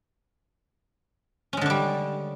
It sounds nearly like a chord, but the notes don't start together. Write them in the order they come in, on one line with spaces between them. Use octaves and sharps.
C#4 G#3 D3 D4 G3